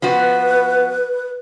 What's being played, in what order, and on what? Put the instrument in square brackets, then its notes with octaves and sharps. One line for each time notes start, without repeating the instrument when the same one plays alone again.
[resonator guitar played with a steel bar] F3 B3 F#4 [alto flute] B4